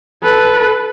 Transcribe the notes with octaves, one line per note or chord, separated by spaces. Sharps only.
A4 B4